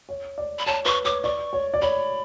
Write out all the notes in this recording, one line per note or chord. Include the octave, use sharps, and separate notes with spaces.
C#5
D5
B5
C#5 A5
B4 C#6
C#5 D6
D5 C#6
C#5
D5
C#5 B5